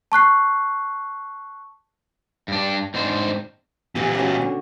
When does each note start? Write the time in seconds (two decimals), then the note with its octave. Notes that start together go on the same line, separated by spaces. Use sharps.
0.12 A5 C#6 F#6 C7
2.48 G2 D4
2.94 G#2 C4 D4 C5
3.95 A#2 E3 B3 G4 B4
4.15 C#4 F#4
4.42 D3